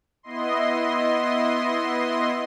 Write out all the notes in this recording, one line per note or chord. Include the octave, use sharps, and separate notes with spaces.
B3 E4 D#5 C6